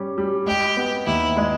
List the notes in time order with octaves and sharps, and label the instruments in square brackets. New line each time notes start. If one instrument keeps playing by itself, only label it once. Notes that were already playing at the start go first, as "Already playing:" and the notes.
Already playing: [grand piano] G3 C#4
G3
[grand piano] G#3 [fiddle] G4
[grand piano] B3
[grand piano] D#2 [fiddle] E4
[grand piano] G#3